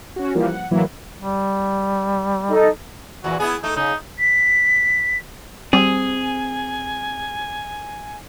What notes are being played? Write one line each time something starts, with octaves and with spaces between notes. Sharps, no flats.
C#4 F#4
E3 F3 G3 A#3
F#5
A2 E3 F#3 A#3 E4
G3
D#4 A4 D#5
E2 A#2 E3 F#4
B3 E4 G#4
A3 D#4
C#3 D#4
B6
G3 C4 G#4 G#5